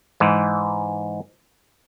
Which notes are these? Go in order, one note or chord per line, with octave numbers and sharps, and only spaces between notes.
G#2 E3